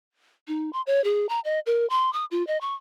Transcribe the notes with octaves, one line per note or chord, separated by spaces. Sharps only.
D#4
C6
C#5
G#4
A#5
D#5
A#4
C6
D#6
F4
D#5
C#6